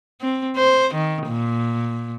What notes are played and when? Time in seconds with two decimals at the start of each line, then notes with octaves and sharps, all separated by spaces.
0.21 C4
0.57 C5
0.95 D#3
1.27 A#2